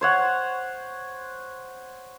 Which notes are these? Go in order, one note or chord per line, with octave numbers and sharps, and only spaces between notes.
C5 C#5 F#5